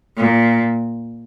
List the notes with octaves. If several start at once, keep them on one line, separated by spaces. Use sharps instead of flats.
A#2